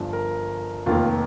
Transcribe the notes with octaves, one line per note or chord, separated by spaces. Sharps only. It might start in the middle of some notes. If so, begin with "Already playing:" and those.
Already playing: G1 G2 F3
A#4
F1 D#2 D#3 F4